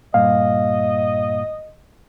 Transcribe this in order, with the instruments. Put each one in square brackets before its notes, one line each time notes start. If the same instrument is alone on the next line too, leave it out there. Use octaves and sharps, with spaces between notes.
[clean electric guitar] G2 A#2 [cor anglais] D#5 [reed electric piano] F5